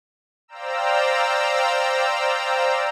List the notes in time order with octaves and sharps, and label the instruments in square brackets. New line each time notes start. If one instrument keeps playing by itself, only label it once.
[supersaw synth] C5 D5 F5 G5 A#5 E6